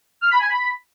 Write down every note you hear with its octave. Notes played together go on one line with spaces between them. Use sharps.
F6
B5
G#5
B5